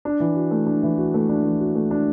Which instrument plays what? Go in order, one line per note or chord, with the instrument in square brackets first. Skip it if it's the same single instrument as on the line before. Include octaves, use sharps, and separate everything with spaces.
[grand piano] D4
E3
F#4
A3
D4
E3
F#4
A3
D4
E3
F#4
A3
D4